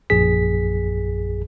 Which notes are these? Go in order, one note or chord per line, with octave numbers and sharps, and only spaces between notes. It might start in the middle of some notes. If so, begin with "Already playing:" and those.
A#1 F#2 G#4 B6